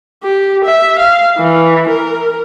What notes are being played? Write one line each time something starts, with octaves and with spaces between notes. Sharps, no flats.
G4
E5
F5
E3
A#4